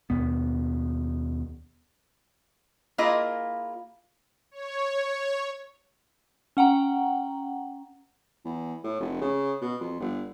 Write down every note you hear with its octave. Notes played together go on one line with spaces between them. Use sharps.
D#2 B2 B3
A#3 E4 F4 G#4 D#5
C#5
C#4 F#5 G5 A#5
E2
A2
F1
C#3
B2
F2
G1